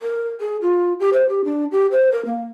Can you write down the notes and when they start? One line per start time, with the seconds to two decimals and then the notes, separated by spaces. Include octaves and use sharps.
0.02 A#4
0.40 G#4
0.62 F4
1.00 G4
1.13 C5
1.29 G4
1.45 D4
1.72 G4
1.92 C5
2.12 A#4
2.25 A#3